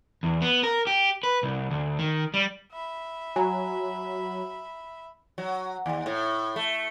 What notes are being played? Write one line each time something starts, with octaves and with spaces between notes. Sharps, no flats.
E2
B3
A#4
G4
B4
C2
D2
D#3
G3
E5 B5
F#3 G#5 A#5
F#3
D#2
A2
A3